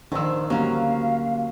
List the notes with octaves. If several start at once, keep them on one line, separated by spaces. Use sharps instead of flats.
A#1 D#3 F3 C5 E6
D2 F#3 G3 A#3 C#4 F5 A#5